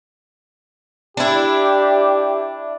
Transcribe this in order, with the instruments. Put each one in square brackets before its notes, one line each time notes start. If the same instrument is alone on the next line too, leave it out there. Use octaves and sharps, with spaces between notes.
[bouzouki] D4 E4 [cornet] G4